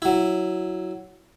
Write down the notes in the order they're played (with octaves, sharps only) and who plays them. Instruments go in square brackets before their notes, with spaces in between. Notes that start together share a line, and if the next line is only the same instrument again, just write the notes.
[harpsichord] F#3 E4